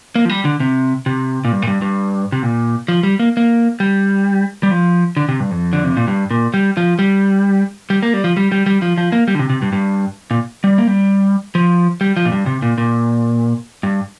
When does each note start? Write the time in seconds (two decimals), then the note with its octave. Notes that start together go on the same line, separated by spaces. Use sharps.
0.15 A#3
0.25 F3
0.29 G3
0.45 D3
0.60 C3
1.06 C3
1.45 A#2
1.52 G2
1.62 A#2
1.67 G2
1.82 G2
2.32 C3
2.43 A#2
2.88 F3
3.03 G3
3.20 A#3
3.37 A#3
3.80 G3
4.63 G3
4.71 F3
5.17 D3
5.29 C3
5.40 G2
5.51 F2
5.73 D3
5.84 C3
5.97 A#2
6.08 G2
6.31 A#2
6.54 G3
6.77 F3
6.99 G3
7.90 G3
8.03 A#3
8.13 G3
8.24 F3
8.37 G3
8.52 G3
8.66 G3
8.82 F3
8.98 F3
9.12 A#3
9.28 G3
9.35 D3
9.39 C3
9.50 C3
9.62 G2
9.73 G2
10.31 A#2
10.64 G3
10.78 A#3
10.87 G3
11.55 F3
12.01 G3
12.17 F3
12.25 A#2
12.32 G2
12.46 C3
12.62 A#2
12.78 A#2
13.83 G2